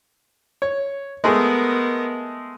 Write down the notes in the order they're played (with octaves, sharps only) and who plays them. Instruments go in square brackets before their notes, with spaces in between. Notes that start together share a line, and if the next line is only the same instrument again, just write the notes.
[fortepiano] C#5
[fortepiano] G#3 A3 G#4 [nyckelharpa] B3 A#4